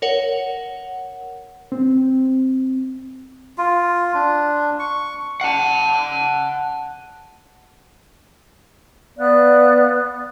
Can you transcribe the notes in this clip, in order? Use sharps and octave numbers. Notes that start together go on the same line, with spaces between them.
A#4 C#5 F#5
C4
F4
D4
C#6
F#5 A5
B3 D5 F5 F#6